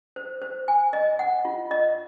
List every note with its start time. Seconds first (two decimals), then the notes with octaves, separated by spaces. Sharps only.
0.16 C5
0.42 C5
0.68 G#5
0.93 D#5
1.19 F#5
1.45 F4
1.71 D#5